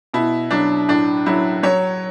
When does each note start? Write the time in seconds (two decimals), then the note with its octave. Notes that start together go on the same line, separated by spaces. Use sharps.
0.14 B2 E4
0.51 F#3 D4
0.88 A2 D4
1.26 F#3 E4
1.63 F#3 C#5